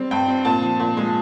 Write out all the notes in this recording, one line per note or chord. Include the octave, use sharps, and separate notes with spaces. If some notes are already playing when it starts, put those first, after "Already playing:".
Already playing: G3 C4
G2 G5
C4
A#2 A5
F3
A#2
G#3